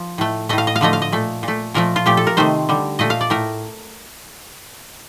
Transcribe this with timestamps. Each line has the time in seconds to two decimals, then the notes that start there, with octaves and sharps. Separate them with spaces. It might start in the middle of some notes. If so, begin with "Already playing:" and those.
Already playing: F3
0.18 A2 A3
0.49 A2 A3 D#5
0.58 F5
0.67 D#5
0.76 F5
0.81 D3 F3 A3 D#5
0.93 F5
1.02 D#5
1.12 A#2 A3
1.43 A#2 A3
1.74 A#2 F3 A3 A#4
1.96 F4
2.06 A#2 F3 A3 G4
2.17 A4
2.27 A#4
2.37 C3 D#3 A3 C5
2.69 D3 G3
2.99 A#2 A3 D#5
3.10 F5
3.21 D5
3.30 A2 A3 A#4